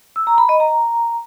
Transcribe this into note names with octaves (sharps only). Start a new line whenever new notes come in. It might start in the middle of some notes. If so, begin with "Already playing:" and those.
E6
A#5
B5
D#5
A#5